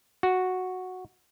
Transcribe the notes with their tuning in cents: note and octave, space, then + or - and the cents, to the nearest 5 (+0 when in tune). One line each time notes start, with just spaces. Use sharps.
F#4 -5